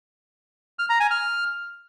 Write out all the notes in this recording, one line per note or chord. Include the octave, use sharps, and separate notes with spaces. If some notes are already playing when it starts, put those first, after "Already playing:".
F6
A#5
G#5
F6